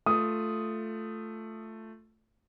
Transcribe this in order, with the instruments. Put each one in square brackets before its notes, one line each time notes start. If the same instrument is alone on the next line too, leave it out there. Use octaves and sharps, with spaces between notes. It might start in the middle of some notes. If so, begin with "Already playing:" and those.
[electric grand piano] A3 F4 [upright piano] D#6